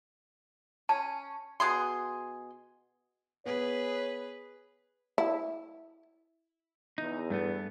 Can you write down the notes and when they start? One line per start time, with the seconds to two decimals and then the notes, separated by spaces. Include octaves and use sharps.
0.89 C#4 A5
1.60 B2 G#4 C6
3.46 B3 G#4 B4 C#5
5.18 E4
6.98 E2 D#4
7.30 G2 A3 B3